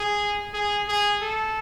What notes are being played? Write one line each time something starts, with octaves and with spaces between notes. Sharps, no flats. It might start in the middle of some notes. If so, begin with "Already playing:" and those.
Already playing: G#4
G#4
G#4
A4